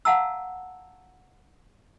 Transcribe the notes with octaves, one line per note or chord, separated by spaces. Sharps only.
F5 F#5 A5 A#5 E6